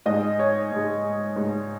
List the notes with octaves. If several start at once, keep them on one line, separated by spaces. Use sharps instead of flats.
G#2 G#3 D#5
C#5
G#2 G#3
G#2 G#3